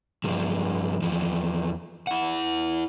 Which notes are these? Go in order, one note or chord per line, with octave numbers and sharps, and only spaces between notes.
G2 F3 G#3
E2 F3
E4 F#5